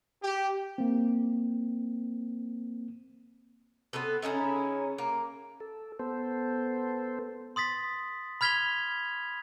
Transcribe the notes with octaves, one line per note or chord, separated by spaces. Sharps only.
G4
A#3 C4
B3 C4 A4 B4
C#3 C#4 D#4 E4
A#3
A4
B3 A4 C5
C6 D#6 A6 B6
B5 F6 G#6 B6 F7 G7